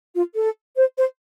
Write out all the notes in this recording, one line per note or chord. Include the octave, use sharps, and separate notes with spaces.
F4
A4
C5
C5